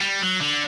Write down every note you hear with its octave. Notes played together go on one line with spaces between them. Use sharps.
G3
F#3
D3